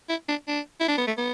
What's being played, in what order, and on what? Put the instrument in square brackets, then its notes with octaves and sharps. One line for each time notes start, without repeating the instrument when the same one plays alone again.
[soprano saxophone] E4
D4
D4
E4
D4
B3
A3
B3